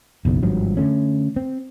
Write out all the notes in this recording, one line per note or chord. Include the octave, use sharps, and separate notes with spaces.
F#1 B1 E2
G#1 G2 F3 F#3
D3 F3 A3 C#4
C4